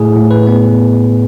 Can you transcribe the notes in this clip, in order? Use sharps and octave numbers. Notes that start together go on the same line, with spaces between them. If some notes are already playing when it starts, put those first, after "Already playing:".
Already playing: A2 G#4
A2
B4
B3